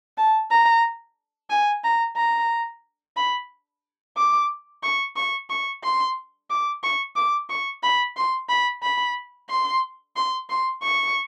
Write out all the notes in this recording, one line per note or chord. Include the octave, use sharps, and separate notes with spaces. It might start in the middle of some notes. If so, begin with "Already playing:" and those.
A5
A#5
G#5
A#5
A#5
B5
D6
C#6
C#6
C#6
C6
D6
C#6
D6
C#6
B5
C6
B5
B5
C6
C6
C6
C#6